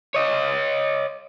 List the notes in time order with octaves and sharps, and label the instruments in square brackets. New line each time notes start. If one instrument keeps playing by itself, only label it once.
[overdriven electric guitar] C#5 D#5